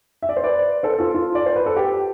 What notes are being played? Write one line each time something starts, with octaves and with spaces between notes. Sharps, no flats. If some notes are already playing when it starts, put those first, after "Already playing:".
E5
D5
C5
B4 D5
A4 C5
F4 A4
F4
D5
C5
B4
A4
G4